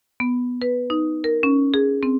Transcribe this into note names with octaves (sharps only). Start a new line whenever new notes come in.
B3
B4
D#4
A#4
C#4
G#4
C4